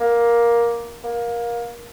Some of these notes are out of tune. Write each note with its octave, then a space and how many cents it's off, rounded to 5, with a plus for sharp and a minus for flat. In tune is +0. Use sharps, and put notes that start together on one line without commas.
A#3 +10
A#3 +20